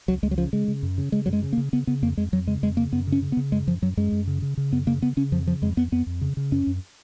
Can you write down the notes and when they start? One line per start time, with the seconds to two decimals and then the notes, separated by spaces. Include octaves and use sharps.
0.08 C#2 F#3
0.23 C#2 G#3
0.31 F#3
0.38 C#3 F3
0.53 C#3 G#3
0.68 C#3
0.83 F#2
0.98 C#3
1.12 C#3 G#3
1.26 F#2 F#3
1.33 G#3
1.43 C#3
1.53 A#3
1.57 C#3
1.73 C#3 B3
1.87 C#3 B3
2.02 F2 A#3
2.17 F2 G#3
2.32 F2 F#3
2.47 C#3 G#3
2.63 F2 G#3
2.77 C#3 A#3
2.92 F#2 B3
3.07 C#3
3.12 C#4
3.22 C#3
3.32 B3
3.37 C#3
3.52 F#2 G#3
3.67 F#2 F3
3.82 F#2 F#3
3.97 F#2 G#3
4.12 F#2
4.27 C#3
4.42 C#3
4.57 C#3
4.72 F#2 B3
4.87 C#3 A#3
5.02 C#3 B3
5.17 C#3 C#4
5.32 F2 F3
5.47 C#3 F3
5.62 F2 G#3
5.77 F2 B3
5.92 F2 B3
6.07 F2
6.21 C#3
6.37 C#3
6.52 F#2 C#4
6.67 F#2